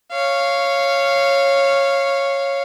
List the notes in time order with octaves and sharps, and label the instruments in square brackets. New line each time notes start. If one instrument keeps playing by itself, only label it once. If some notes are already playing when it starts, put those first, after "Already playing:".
[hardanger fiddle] C#5 F5